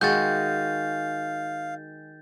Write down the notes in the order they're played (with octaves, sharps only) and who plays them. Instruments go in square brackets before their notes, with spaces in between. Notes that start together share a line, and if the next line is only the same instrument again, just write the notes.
[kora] D#3 G#3 F#4 [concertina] F5 [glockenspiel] G6 A6